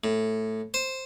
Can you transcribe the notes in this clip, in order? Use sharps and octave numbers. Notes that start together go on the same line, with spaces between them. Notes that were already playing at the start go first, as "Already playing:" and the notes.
A2
C5